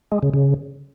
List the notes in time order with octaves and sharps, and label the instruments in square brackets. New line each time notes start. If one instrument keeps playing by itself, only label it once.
[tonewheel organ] G#3
C#3
C#3